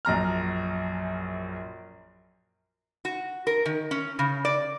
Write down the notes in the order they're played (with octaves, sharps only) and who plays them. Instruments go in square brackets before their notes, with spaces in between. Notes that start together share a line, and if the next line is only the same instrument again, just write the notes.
[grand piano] A#1 F#2 A#5 F6
[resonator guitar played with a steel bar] F#4
A#4
D#3
C#4
C#3
D5